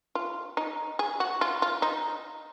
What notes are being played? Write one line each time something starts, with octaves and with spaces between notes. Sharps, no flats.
F4
D#4
G#4
F#4
F4
F4
D#4